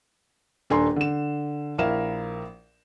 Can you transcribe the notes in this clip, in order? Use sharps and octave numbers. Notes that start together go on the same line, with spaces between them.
D#1 D4 A4 G#5 A#5 C6
D3 E7
A#1 E4 A#4 E5 F5 E7